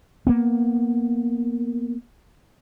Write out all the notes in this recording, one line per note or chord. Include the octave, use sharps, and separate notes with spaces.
A#3 B3